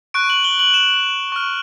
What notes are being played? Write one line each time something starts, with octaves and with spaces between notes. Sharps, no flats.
C#6 F#6 D7
F#7
G7
F#7
E7
C#6 F6